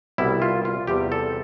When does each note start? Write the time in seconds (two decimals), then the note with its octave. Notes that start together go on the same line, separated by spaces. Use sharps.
0.18 C2 B2 G3 E4
0.42 F4
0.65 F4
0.87 E2 C3 G3 G4
1.12 A4